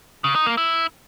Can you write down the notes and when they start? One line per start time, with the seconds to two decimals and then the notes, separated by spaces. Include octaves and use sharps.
0.24 C#3
0.35 D#4
0.46 A#3
0.57 E4